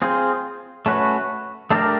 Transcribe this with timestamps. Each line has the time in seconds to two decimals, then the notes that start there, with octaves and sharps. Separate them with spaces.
0.02 C4 F4 G#4 C5
0.86 A3 C#4 F#4 B4
1.70 A3 D4 G4 A#4